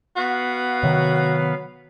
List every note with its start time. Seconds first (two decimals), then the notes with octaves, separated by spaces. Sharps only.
0.16 B3 F#4 B4 F5
0.83 C3 D#3 F#3